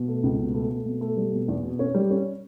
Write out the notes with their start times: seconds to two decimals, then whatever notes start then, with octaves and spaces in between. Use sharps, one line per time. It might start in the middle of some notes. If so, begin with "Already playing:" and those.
Already playing: B2
0.08 A3
0.23 C#2
0.39 B2
0.54 A3
0.70 A3
0.86 B2
1.01 A3
1.17 G3
1.32 B2
1.48 E2
1.63 B2
1.79 C#4
1.94 G3
2.10 C#4